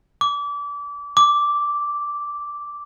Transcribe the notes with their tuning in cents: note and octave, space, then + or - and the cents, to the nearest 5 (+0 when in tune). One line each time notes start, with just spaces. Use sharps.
D6 -30
D6 -5